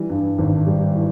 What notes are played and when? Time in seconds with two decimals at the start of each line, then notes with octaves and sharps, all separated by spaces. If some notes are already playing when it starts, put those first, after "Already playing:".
Already playing: E3 G3
0.10 G2
0.38 G#1
0.67 G3
0.95 E3